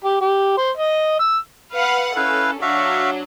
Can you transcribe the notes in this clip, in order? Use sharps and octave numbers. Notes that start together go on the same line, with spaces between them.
G4
G4
C5
D#5
E6
B4 F5 F#5
C#4 E4 A4 B4 F5
F#3 D4 F#4 E5 F5